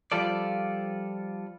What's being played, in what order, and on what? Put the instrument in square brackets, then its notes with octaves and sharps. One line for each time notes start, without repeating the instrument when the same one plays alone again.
[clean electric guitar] F3 G3 F4 A4 D5